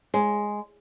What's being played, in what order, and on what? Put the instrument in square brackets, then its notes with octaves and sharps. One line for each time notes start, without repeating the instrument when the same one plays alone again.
[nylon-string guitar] G#3